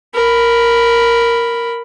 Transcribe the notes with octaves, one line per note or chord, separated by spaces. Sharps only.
A#4 B5